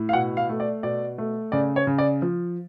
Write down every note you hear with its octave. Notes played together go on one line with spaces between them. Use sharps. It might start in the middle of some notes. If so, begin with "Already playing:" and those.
Already playing: A2
F5
B2 F#5
F5
A3
D5
B2 D5
A3
C#3 D5
C#5
C#3
D5
F3